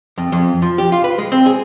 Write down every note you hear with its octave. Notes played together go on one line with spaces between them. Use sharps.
F2
F2
F3
G4
F4
B4
G#3
C4
G#4